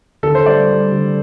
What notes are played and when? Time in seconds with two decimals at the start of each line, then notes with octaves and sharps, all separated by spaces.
0.23 D3 A4
0.35 C5
0.46 G3 D5
0.69 G3
0.92 D3